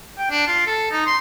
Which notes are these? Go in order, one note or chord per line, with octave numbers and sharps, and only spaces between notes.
G5
D4
F4
A4
D#4
C6